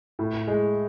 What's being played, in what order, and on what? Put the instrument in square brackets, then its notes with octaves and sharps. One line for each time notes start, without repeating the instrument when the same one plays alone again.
[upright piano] A2
G#3